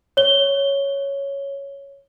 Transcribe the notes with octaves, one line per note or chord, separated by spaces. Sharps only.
C#5 G7